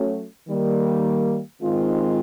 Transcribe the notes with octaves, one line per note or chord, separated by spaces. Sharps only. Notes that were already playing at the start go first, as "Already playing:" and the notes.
Already playing: F#3 A3 C#4
D#3 G3 A#3
G#2 D#3 G#3 C4 F4